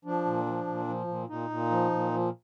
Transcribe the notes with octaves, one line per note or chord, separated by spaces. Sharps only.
F3 D4
A#2
F3
A#2
F3
A#2
A#2 D#4
A#2
F3
A#2
F3